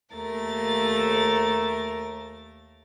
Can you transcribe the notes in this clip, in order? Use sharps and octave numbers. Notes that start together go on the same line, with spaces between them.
D#2 A3 A#4 A6